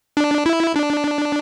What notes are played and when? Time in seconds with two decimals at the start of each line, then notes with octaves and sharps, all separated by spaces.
0.17 D4
0.46 E4
0.76 D4